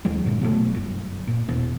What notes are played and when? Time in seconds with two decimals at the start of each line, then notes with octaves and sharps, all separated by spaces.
0.05 D#2 E3 F#3 G#3
0.25 G2 A#2 D3 G#3
0.41 B2 F#3 G3 A3
0.75 G1 F#2
1.27 A#2
1.48 E2 B2